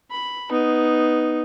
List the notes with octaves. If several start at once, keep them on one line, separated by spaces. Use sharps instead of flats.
B5
B3 D#4